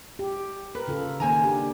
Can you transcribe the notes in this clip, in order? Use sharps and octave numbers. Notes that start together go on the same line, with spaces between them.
G4
A#4 B4
C#3 F4 A4
D#3 A#3 C5 G#5 A#5
D4 G4